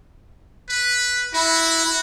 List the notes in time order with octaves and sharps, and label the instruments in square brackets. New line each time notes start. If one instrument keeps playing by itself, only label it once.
[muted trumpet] B4
[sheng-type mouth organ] E4 [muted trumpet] F#4